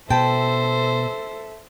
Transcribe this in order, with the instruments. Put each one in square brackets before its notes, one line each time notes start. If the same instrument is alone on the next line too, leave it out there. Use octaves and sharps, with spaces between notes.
[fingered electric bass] B2 [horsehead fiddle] A4 E5 [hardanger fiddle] C5 [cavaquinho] G5 A5 B5